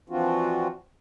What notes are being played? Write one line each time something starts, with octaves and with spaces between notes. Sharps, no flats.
E3 F3 C4 D4 F4 F#4